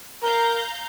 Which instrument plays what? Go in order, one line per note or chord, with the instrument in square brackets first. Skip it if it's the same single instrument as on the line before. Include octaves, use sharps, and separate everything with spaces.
[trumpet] A#4 [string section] F5 A#5 G6